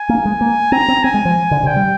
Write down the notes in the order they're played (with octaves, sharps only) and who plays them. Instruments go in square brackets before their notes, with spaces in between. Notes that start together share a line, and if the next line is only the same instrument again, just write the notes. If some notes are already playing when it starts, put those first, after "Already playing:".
Already playing: [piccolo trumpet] G#5
[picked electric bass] A#3
G#3
A#3
[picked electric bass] C4 [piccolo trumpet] A#5
[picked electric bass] C4
[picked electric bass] C4 [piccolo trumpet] G#5
[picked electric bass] G#3
F3
D3
C3
[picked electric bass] D3 [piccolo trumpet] G5
[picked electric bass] G3